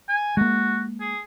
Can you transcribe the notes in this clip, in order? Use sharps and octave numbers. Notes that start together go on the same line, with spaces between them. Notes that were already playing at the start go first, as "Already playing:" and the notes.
G#5
G#3 A#3 F#4
G#4